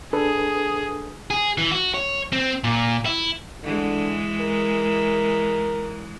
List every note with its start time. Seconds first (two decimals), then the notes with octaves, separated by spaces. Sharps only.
0.13 D4 G#4 A4 B4
1.30 G#4
1.58 E3
1.72 F#4
1.94 C#5
2.33 C4
2.64 A#2
3.06 E4
3.63 D3 E3 G#3
4.41 A#4